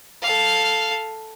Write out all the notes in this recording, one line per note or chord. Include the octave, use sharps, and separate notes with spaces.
A4 F5